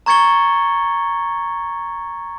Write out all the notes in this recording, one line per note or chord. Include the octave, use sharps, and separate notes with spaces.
A#5 C#6 G#6 A6 C#7 G7